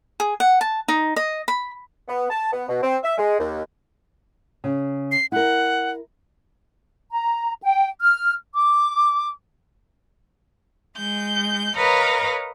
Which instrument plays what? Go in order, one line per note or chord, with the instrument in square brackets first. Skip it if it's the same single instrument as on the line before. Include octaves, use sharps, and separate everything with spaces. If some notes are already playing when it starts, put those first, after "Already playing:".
[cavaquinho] G#4
F#5
A5
D#4
D#5
B5
[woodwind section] B3
A5
B3
B2
C4
E5
G#3
D#2
[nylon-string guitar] C#3
[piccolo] C7
[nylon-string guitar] E4 A#4 [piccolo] F#5
[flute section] A#5
G5
F6
D6
[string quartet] G#3 G6
A#4 B4 C#5 D#5 F5 A#5